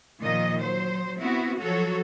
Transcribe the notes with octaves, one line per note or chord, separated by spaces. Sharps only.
A#2 D#3 F3 D#5
F#3 C5
B3 C4 E4 F#4
F3 F#3 F#4 A4 C#5